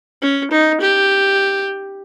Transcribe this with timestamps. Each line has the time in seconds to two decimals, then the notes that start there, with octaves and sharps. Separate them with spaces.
0.22 C#4
0.51 D#4
0.81 G4